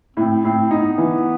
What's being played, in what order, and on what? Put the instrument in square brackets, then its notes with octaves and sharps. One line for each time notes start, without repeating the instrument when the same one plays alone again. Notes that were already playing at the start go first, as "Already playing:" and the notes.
[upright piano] A2 [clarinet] C4
[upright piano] A2 [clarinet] C4
[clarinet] B3 [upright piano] D#4
[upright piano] E3